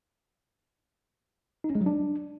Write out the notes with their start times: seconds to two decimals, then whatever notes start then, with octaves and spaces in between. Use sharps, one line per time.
1.64 D#4
1.70 C#4
1.75 G#3
1.81 F#3
1.86 D4